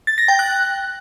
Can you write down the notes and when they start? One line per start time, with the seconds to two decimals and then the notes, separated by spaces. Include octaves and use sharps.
0.07 A6
0.18 A#6
0.28 G5
0.39 F#6